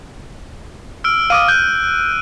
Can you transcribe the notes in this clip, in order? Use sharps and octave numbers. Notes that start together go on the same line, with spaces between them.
E6 F6 D7
F5 D6 D#6 D#7
F#6 G6